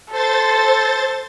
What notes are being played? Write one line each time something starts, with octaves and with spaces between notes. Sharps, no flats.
A4 C5 A6